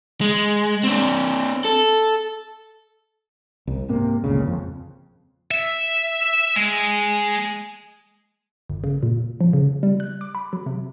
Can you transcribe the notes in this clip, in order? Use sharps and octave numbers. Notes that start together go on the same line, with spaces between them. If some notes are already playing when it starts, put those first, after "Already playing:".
G#3
C4 D4
A4
C2
G#2 C3 A#3
G1 C#2 A#2 C#3
F2
E5
G#3
G1
C#3
A#2
F3
C#3
G3
F#6
D6
B5
F#3
C3